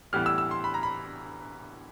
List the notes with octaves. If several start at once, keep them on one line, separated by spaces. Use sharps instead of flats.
A2 E3 G3 B3 E4 F6
E6
E6
C6
B5
A#5
B5